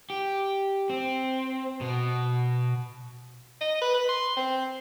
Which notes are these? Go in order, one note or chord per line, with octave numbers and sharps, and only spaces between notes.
G4
C4
B2
D#5
B4
B4
C6
C4